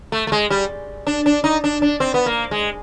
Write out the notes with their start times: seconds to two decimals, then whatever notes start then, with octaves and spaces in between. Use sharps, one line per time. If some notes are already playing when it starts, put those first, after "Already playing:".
0.12 A3
0.27 A3
0.32 G#3
0.50 G3
1.07 D4
1.26 D4
1.44 D#4
1.64 D4
1.82 D4
2.00 C4
2.14 B3
2.26 A#3
2.51 G#3